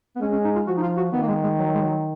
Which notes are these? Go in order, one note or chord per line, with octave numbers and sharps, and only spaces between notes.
B3
G#3 C#4
C#4
D#4
F4
F3 F#4
D#4
F4
F#4
D#3 B3
A#3
G#3
G#3
F#3
G#3
F#3